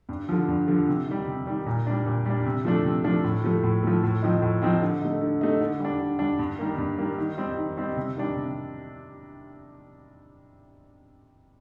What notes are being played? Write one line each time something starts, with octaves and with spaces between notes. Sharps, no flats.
G2
D3 F3
G2
D3 F3
C3
D#3 G3
C3
D#3 G3
A#2
G3 D4
A#2
G3 D4
C3
F3 A3 D4
C3
F3 A3 D4
A2
F3 A3
A2
F3 A3
A2
F3 C4 D#4
A2
F3 C4 D#4
D3
A3 D#4
D3
A3 D#4
D3
G3 D4
D3
G3 D4
G2
D#3 G3 A#3
G2
D#3 G3 A#3
D#3
G3 C4 D#4
D#3
G3 C4 D#4
C3
D#3 G3 D4
C3